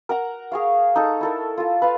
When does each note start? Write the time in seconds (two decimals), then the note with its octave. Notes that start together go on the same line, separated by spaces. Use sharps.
0.09 A#4 F#5 A#5
0.52 G#4 C#5 F5
0.96 D#4 A4
1.21 E4 A4 A#4
1.57 F4 A4
1.82 B4 F5